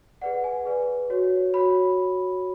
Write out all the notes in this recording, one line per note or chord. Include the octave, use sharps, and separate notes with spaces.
G#4 B4 D5 F#5
G#5
G#4 B4 D5
F#4 C#5
F#4 C#5 B5